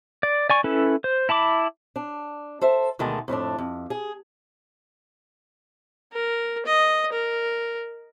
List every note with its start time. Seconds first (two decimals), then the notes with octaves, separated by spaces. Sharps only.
0.23 D5
0.50 D5 G#5 C#6
0.64 C#4 E4 A4 B4
1.04 C5
1.29 E4 A5 B5 D6
1.96 D4
2.61 A4 C5 E5
2.99 D2 B2 D#3 G#3 A3 A5
3.28 F2 A2 A3 D4
3.58 F2
3.90 G#4
6.13 A#4
6.66 D#5
7.13 A#4